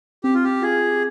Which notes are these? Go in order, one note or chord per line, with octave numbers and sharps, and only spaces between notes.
C4 G4
F4
G4
F4 G#4